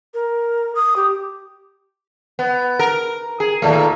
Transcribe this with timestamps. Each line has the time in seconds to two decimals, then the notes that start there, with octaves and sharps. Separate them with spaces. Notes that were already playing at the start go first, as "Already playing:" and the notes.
0.14 A#4
0.75 D#6
0.96 G4
2.39 B3
2.79 A#4
3.40 G#4
3.62 D#2 A#2 A3